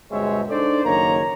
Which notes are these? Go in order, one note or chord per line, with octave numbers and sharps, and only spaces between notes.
G1 B2 G#3 C4 C#5 E5
D4 D#4 A4 C5 D5
F#1 D#3 A#3 C#5 A#5